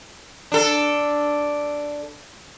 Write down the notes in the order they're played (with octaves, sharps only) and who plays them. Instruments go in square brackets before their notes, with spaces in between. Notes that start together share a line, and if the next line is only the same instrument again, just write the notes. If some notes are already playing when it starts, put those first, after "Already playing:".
[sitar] D4 A4